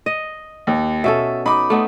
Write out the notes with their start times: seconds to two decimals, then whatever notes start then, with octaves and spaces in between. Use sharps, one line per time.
0.06 D#5
0.67 D#2
1.04 B2 C#4 A4 E5
1.46 D#4 B5 D6
1.70 A3 B3 D#4